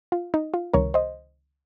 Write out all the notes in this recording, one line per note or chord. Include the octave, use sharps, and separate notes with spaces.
F4
D#4
F4
C#2 C3 D#3 G3 A#4 C#5
C5 D#5